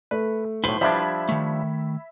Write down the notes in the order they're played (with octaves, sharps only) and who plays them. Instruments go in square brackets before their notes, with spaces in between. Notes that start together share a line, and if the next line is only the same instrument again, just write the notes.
[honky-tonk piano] A3 [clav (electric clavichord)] B4
[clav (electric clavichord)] B1 A2 [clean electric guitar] E4 B4 C5 [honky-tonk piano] F#7
[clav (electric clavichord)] F3 G3 D4 [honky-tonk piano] E5 B5 G#6
[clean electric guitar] D#3 A3